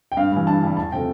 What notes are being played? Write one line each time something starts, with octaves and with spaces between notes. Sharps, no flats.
G5
G2 F5
E3 G3
G2 A5
E3 G3
E2 A5
C3 F3 A3 G5